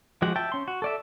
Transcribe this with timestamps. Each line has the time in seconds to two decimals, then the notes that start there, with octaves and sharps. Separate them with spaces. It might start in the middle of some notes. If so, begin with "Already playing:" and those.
0.22 F3 G#3 F#4 G4 F#5
0.36 E5 G5 A5
0.52 C#4 C6
0.68 F#4
0.82 A4 D5 E5